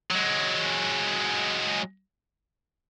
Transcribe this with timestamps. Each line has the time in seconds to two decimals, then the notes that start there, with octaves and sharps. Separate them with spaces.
0.11 F#3 G#3